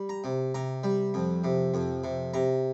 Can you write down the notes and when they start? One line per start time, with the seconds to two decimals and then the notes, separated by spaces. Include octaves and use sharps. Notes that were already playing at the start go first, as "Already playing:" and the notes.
Already playing: G3
0.09 A#5
0.24 C3
0.54 C3 A#5
0.84 G3
1.14 F2
1.44 C3
1.74 F2
2.04 C3
2.34 C3 A#5